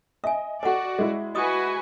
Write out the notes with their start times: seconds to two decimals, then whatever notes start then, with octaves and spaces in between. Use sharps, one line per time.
0.24 D#5 E5 G#5
0.63 F#4 A4 D5 D#5 F#5
0.99 G#3 E4
1.35 F#4 B4 D#5 G#5 D#6